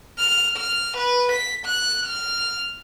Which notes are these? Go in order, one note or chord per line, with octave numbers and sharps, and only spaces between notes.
F6
F6
B4
B6
F#6
F6